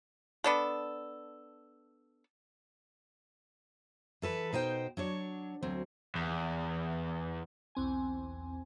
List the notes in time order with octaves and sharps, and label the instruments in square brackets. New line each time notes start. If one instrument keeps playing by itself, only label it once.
[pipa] B3 D4 A4
[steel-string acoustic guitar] E3 A4 B4
B2 D#4 C5 G5
F#3 D4 C#5
D2 F#3 C4
[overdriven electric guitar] E2
[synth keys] B1 E2 C4 G#5